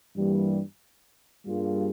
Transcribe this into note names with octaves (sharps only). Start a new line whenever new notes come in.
G2 E3 G3 A#3
G2 G3 A#3 F4 G#4